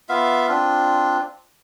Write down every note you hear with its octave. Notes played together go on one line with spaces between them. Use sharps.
B3 F4 E5 F5
C4 D4 F4